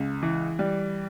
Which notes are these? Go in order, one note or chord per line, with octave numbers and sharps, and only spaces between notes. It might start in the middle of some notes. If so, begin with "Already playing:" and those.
Already playing: C#2
E3
G3